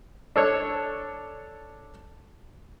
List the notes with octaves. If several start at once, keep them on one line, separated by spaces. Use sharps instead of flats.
D4 A4 C#5